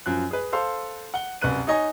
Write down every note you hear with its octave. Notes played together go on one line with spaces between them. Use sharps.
F#2 F3 F#6
G#4 B4
A4 C5 F5 C6
F#5 G7
C2 F#2 B4 F#6 D#7
D#4 C#5 D#5 G#5